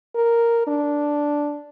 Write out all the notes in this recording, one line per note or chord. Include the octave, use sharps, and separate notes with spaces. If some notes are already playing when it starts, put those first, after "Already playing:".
A#4
D4